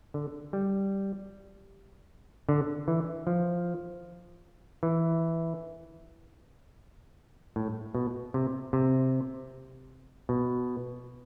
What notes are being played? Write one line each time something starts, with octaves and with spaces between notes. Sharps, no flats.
D3
G3
D3
E3
F3
E3
A2
B2
C3
C3
B2